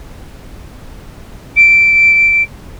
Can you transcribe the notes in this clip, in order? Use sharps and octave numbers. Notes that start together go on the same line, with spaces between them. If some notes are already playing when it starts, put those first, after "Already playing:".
D7